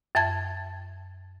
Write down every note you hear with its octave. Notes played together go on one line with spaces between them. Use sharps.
F#2 E5 A5 G#6 A6